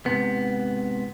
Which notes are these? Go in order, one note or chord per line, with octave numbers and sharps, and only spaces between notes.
G#2 C3 B3